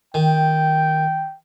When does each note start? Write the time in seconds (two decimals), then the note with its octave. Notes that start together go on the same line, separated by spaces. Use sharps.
0.14 D#3 G5